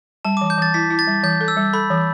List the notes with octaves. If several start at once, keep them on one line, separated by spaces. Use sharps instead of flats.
G3 A5
E3 D6
G6
E3 A6
E4 B6
E4
A6
G3
E3 G6
A4
E6
G3
A4 B5
E3